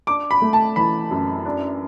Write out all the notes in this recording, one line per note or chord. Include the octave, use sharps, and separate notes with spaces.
D4 D6
B5
A3
A5
E3 B5
F#2
D4